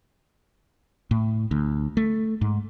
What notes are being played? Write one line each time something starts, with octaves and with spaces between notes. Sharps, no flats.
A2
D2
A3
G#2